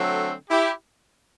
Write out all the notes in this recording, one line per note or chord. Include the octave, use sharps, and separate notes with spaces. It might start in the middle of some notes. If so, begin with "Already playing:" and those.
Already playing: D3 F#3 A3 C4
E4 G4